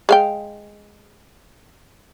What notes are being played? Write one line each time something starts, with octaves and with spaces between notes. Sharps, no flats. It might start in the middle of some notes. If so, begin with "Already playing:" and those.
G#3 F5 G5